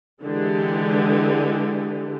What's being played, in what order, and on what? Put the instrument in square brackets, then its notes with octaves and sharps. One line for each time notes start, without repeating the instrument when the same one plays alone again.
[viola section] D3 E3 G#3 G4